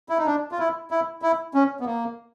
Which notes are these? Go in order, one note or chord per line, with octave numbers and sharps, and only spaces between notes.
E4
D#4
D4
F4
E4
E4
E4
C#4
B3
A#3